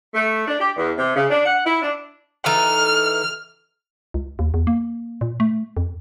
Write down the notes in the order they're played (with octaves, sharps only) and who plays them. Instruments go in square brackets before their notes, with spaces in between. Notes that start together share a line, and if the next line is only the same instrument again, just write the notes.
[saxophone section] A3
D4
G4
E2
C3
C#3
D4
F#5
E4
D4
[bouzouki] E3 D#4 A4 [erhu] F6
[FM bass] C#2
D#2
E2
A#3
A#2
A3
F2